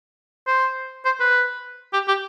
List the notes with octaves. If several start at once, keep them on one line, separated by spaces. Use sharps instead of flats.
C5
C5
B4
G4
G4